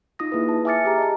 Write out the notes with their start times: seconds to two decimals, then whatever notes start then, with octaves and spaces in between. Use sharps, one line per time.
0.19 D#4 F4 D#6 A#6
0.32 A#3 E4 G#4 B4
0.49 A5
0.65 E5 G#5 D6 F6 A6 C#7
0.85 G4 G#4 A#5
0.98 D#5 A5